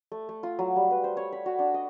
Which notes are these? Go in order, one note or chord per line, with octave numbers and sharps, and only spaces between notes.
A3
A3
F4
F#3
G3
B4
C5
C#5
B5
F#4
D4
D#5